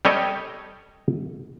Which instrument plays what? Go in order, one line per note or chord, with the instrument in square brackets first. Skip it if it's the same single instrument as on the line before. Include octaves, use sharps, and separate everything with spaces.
[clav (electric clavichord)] G3 G4 A4 C#5 D#5